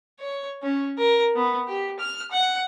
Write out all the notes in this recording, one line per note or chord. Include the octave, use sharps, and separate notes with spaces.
C#5
C#4
A#4
B3
G4
F6
F#5